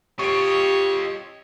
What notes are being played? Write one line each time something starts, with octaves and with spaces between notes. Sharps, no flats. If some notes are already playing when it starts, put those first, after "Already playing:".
F4 G4 C#5 D#5 C#6 D7